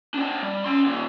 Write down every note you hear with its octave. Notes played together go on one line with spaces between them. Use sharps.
C4 D4
G3
C#4 C6
A#2 D#3